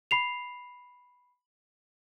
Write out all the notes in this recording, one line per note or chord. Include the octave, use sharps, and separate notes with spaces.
B5 C7 F7